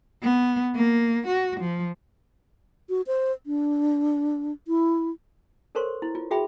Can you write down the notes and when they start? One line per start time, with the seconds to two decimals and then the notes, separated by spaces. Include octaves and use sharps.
0.23 B3
0.75 A#3
1.27 F#4
1.60 F3
2.89 F#4
3.07 C5
3.46 D4
4.68 E4
5.75 A4 A#4 C5 C#5 C6 C#6
6.02 E4
6.15 F4
6.31 F#4 G#4 E5 G5 B5